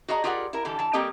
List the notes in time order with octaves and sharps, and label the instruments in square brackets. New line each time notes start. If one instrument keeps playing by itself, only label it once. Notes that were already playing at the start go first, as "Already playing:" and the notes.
[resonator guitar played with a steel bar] F#4 G#4 D5 D#5 A#5
F4 G4 G#4 A#4 D5 F#5
E4 A#4
D3 E3 G3 A4
E3 A5
G3 A#3 C4 G4 A4 D#5